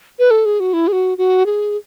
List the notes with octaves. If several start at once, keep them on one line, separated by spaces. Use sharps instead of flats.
B4
A4
G#4
F#4
E4
G#4
F#4
F#4
G#4